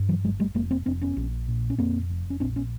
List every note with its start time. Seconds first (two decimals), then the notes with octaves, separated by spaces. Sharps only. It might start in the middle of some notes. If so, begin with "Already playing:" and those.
Already playing: G2
0.09 E3 F#3
0.24 G1 F#3 G#3
0.40 G3 A3
0.55 F1 G#3 A#3
0.71 A#3 C4
0.86 F1 C4 D4
1.01 B3 C#4
1.17 A#1
1.48 A#2
1.70 C#4
1.78 F2 A#3 C4
2.10 F1
2.30 C#4
2.40 A#1 C4 D4
2.56 B3 C#4